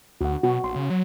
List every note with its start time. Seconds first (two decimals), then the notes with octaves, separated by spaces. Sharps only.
0.21 D2 F#4 F#5
0.43 B2 F#4
0.64 A#1 C6
0.76 C#3
0.90 F#3